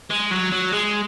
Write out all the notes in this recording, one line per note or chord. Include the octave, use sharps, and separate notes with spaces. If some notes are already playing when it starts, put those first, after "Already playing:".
G#3
F#3
F#3
G#3